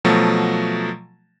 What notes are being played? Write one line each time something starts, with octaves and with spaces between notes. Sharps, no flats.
B2 F3 F#3 A3